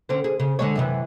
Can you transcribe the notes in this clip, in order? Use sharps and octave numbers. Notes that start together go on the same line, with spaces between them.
D3 C4 C#4
G#4
C#3
D3 G#3 C#5
F#2 C3 E3